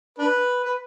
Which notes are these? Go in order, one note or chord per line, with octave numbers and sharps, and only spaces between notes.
D4 B4
B4